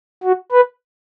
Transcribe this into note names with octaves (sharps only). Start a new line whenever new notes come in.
F#4
B4